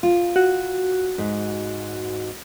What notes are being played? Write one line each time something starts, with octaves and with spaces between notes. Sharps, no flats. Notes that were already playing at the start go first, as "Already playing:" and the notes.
F4
F#4
G#2